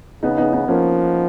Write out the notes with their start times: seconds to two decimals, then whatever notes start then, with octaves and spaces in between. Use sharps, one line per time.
0.23 C#3 B3 D#4
0.37 B3 D#4
0.52 B3 D#4
0.68 F3 A#3 C#4